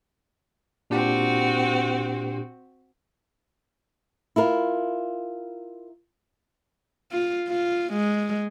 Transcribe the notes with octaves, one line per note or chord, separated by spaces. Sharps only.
A#2 C4 D4 F#4 G4
E4 F4 A#4
F4
F4
G#3